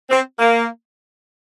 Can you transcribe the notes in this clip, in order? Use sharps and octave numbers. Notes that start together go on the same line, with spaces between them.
C4
A#3